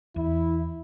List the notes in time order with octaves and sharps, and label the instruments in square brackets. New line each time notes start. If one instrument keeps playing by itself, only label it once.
[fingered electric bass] E2 [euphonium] E4